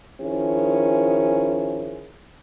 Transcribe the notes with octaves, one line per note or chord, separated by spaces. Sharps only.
D#3 F3 C#4 E4 G#4